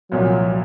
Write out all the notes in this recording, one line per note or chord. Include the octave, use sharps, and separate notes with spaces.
C2 A#2 F3 F#3